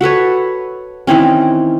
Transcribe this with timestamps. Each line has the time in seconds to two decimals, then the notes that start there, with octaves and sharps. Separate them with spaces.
0.01 F#4 A4 B4 C#5
1.07 D#3 E3 C4 C#4